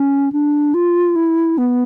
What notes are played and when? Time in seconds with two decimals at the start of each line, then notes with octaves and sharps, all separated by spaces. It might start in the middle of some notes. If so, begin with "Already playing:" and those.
Already playing: C#4
0.32 D4
0.74 F4
1.16 E4
1.58 B3